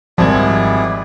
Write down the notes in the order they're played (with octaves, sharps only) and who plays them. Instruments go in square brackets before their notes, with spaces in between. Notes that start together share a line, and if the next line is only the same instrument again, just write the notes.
[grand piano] G#1 [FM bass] F3 [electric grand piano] G3 C4 G#6 [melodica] E4 G#4 D5